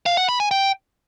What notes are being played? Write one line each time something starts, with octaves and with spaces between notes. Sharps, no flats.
F5
F#5
B5
G#5
G5